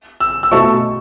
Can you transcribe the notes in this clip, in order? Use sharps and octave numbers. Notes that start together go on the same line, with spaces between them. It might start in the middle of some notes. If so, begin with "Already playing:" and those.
E6
E6
B2 A3 E4 A4 C#6